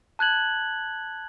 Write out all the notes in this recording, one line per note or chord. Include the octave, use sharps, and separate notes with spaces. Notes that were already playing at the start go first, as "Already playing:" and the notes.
A5 F#6 G#6 F#7